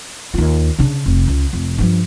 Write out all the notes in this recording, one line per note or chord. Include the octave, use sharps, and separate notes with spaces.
D#2 F4
C#3 D4
F1
C#2
F1
G2 F3